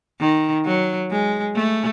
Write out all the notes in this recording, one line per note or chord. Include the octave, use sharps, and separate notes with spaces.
D#3
F#3
G#3
A3